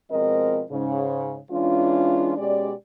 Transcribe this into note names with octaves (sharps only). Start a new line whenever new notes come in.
B2 F3 G#3 C4 A#4 D#5
G#2 C#3
E3 G#3 C#4 D4 F4
B2 G#3 C#4 G4 D5